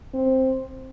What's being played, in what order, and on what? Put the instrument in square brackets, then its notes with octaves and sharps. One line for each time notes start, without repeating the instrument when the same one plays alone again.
[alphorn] C4